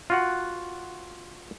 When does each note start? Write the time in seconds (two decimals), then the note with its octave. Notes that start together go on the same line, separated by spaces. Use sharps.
0.10 F4 F#4 F#5